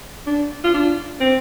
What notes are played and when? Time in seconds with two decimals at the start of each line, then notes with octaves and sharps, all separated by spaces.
0.27 D4
0.64 F4
0.74 D4
1.20 C4